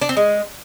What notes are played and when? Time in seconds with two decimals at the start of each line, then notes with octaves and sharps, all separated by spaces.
0.01 D4
0.09 C4
0.17 G#3